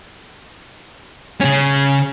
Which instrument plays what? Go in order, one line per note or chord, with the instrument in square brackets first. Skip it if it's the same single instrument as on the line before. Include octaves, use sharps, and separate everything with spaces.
[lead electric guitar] C#3 C#4